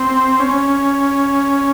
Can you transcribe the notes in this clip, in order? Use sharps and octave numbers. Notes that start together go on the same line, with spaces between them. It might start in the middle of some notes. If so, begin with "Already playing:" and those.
Already playing: C4
C#4